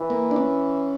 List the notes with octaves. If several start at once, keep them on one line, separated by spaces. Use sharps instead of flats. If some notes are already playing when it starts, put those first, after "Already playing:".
Already playing: E3
A#3
D4
C#4